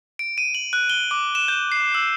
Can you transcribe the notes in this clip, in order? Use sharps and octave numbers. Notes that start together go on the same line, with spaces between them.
D7
D#7
F#7
F#6
G7
D6
E7
G6
C7
E6